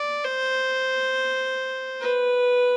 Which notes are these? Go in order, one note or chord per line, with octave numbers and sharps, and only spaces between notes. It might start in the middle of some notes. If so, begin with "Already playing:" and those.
Already playing: D5
C5
B4